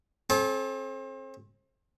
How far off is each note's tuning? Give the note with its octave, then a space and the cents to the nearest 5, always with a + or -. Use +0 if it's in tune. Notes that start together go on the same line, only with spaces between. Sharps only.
C4 +35 A4 -35